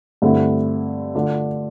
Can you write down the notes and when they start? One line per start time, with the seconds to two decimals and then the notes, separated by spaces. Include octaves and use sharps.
0.22 G2 D3 A3 C4 E4
1.15 D3 A3 D4 F4